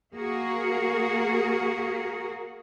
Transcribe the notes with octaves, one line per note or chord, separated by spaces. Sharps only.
A#3 F#4 G#4 A#4